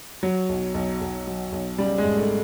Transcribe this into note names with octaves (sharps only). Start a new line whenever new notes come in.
F#3
B1
B1
B1
F#3
B1
C#3 G3
G#3
G#1
A3